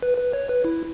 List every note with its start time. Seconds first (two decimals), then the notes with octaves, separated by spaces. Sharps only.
0.03 B4
0.18 B4
0.33 C#5
0.49 B4
0.65 E4